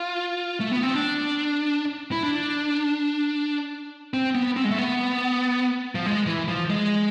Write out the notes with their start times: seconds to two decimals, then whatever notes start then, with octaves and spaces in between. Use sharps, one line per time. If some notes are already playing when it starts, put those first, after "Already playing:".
Already playing: F4
0.60 A3
0.72 B3
0.83 C4
0.94 D4
2.12 E4
2.23 D4
4.14 C4
4.35 B3
4.56 C4
4.64 G#3
4.71 A3
4.78 B3
5.95 F3
6.06 G#3
6.26 E3
6.48 F3
6.70 G#3